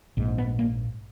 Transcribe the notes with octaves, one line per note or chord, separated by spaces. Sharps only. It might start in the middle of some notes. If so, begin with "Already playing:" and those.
A#1 G#2
B3
A#3